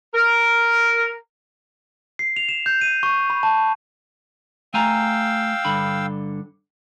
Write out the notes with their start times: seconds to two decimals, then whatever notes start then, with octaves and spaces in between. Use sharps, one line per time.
0.14 A#4
2.19 C7
2.36 F7
2.49 E7
2.66 G6
2.81 D#7
3.03 C#6
3.30 B5
3.43 A5
4.74 A3 F5 G5 G#5 A#5 E6
5.65 G2 D3 B5